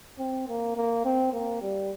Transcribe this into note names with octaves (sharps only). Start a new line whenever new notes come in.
C4
A#3
A#3
C4
A#3
G3